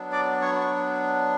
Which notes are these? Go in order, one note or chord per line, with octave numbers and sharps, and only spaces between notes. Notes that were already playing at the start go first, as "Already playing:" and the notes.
Already playing: F#3 B3 D4
D5 D6
C#5 C#6
C#6